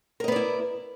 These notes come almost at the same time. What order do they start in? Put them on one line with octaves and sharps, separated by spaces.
A#4 D#5 B3 D5 E4